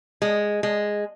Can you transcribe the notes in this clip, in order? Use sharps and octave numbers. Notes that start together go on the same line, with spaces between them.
G#3
G#3